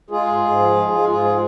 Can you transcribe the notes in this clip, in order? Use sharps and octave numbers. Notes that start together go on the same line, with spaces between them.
G#3 F4 G#4
G#2
G#2
F3
G#3
G#3
G#2 F4 G#4
G#3